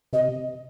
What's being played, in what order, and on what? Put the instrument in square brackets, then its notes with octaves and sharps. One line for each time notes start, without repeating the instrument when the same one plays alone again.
[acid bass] C3 [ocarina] D#5